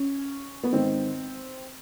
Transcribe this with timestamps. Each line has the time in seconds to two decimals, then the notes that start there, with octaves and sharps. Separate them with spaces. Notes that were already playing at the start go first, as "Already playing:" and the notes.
Already playing: C#4
0.63 B3
0.72 G#2 D#3 C4